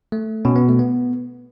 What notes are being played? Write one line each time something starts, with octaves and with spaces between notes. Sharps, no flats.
A3
B2 C#4
B3
A3
B3